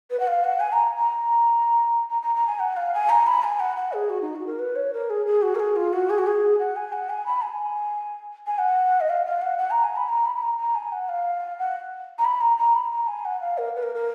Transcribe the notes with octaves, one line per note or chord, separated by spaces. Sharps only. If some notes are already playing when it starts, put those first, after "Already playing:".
B4
F#5
F5
F#5
G#5
A#5
A#5
A#5
A#5
A#5
G#5
F#5
F5
G#5
A#5
B5
G#5
F#5
F#5
G#4
F#4
D#4
F#4
A#4
B4
C#5
A#4
G#4
G#4
F#4
A#4
G#4
F4
F#4
G#4
F#4
G#4
F#5
G#5
F#5
G#5
B5
G#5
G#5
F#5
D#5
F5
F5
F#5
F#5
A#5
G#5
B5
A#5
B5
B5
A#5
A#5
G#5
F#5
F5
F#5
A#5
B5
A#5
A#5
B5
A#5
G#5
F#5
F5
A#4
B4
A#4
A#4